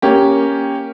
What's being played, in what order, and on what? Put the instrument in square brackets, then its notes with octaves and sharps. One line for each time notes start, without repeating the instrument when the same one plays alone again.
[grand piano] A#3 C#4 G4